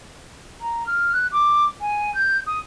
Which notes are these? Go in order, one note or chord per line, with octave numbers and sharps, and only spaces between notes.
A#5
F6
F#6
D6
G#5
G6
D#6